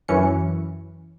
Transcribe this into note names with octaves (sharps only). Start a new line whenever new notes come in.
F#2 E3 C#4 C#7